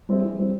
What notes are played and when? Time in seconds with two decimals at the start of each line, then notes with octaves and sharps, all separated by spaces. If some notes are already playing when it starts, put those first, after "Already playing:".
0.09 G3 C4 E4 G#4
0.24 E3
0.39 G3 C4